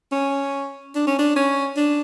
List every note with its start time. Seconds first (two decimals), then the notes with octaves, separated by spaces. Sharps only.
0.12 C#4
0.95 D4
1.07 C#4
1.19 D4
1.36 C#4
1.77 D4